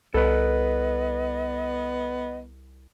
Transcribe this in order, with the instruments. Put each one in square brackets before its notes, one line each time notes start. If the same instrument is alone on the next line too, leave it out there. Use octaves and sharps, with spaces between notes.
[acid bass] C2 [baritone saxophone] B3 [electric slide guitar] A4 B4 [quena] D#5